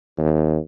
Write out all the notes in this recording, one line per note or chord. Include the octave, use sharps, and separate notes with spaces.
D#2